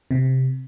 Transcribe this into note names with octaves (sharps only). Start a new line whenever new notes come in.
C3